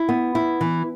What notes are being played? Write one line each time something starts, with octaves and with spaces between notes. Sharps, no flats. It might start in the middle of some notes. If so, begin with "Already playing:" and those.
Already playing: E4
B3
E4
E3